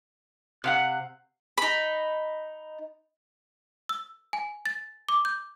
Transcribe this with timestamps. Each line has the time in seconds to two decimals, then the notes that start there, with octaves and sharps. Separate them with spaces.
0.64 C3 F5 F#5 F#6
1.58 D#4 B5
3.89 E6
4.33 G#5
4.66 A6
5.09 D6
5.25 G6